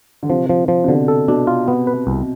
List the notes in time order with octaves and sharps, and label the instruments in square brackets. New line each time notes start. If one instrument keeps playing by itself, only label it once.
[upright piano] D3
[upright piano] C3 [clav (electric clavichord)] F3
[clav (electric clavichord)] F3
F3
[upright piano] C3
[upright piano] B2 [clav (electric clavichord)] D3
[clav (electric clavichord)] A4
[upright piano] B2 [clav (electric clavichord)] D4
[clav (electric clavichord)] F4
B3
B4
C2